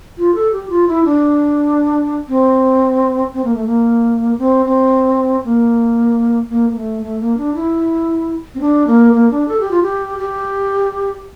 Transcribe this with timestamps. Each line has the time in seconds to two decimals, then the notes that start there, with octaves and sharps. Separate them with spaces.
0.18 F4
0.35 A4
0.52 G4
0.70 F4
0.88 E4
1.05 D4
2.28 C4
3.34 C4
3.44 A#3
3.54 A3
3.66 A#3
4.38 C4
4.66 C4
5.44 A#3
6.50 A#3
6.69 A#3
6.76 A3
7.03 A3
7.20 A#3
7.37 D4
7.55 E4
8.55 C4
8.60 D4
8.87 A#3
9.13 A#3
9.31 D4
9.48 A4
9.60 G4
9.71 F4
9.83 G4
10.19 G4